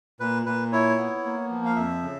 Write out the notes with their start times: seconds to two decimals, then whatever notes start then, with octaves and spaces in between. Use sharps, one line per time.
0.20 A#2 B4
0.46 A#2 B4
0.72 E4 C#5
0.98 B3
1.24 A#3
1.50 F3
1.66 F5
1.76 F2 E5
2.03 C#3